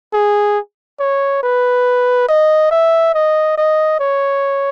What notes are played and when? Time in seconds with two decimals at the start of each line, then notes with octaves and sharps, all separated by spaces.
0.13 G#4
0.99 C#5
1.43 B4
2.28 D#5
2.71 E5
3.14 D#5
3.58 D#5
4.00 C#5